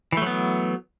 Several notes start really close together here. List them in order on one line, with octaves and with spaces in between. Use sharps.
E3 A3 F#3 B3